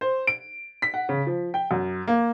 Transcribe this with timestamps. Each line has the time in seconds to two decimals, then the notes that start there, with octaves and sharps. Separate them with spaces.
0.01 C5
0.27 D7
0.82 B6
0.94 F#5
1.09 C#3
1.27 F3
1.54 G5
1.71 F#2
2.08 A#3